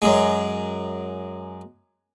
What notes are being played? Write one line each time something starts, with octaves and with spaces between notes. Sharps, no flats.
F#2 G#3